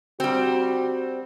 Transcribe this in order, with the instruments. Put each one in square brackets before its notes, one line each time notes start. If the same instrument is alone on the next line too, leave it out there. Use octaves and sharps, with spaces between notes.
[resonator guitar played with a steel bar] G3 C4 [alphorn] F#4